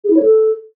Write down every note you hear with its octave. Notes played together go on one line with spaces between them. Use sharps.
G#4
E4
C#5
A4